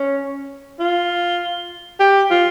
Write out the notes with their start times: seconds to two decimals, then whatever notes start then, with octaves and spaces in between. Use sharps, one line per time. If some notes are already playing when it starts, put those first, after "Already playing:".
Already playing: C#4
0.80 F4
2.00 G4
2.31 F4